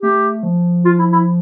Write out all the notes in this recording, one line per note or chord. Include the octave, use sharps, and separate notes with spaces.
A3 G4
F3
F4
E4
E4